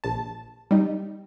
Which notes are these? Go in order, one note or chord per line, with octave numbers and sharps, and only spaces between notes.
A#1 A5
G3 D#4